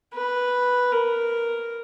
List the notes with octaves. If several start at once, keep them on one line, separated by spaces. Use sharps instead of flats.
B4
A#4